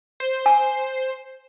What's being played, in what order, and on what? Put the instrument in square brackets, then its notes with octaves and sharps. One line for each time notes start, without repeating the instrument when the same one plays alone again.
[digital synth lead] C5
[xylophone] G#5